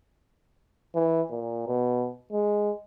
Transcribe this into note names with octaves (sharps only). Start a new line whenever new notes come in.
E3
A#2
B2
G#3